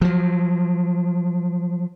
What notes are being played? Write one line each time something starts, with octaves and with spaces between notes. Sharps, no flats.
F3 F#3